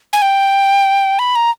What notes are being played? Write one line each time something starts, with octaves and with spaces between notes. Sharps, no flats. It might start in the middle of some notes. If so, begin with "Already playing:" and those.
G#5
G5
B5
A#5